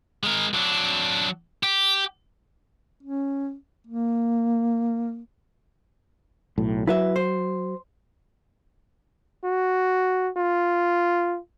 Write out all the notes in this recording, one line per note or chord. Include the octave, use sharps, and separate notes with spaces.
G#3 A#4
F#3 D4
G4
C#4
A#3
B1 A2
F#3 E4 B4 E5
C5
F#4
F4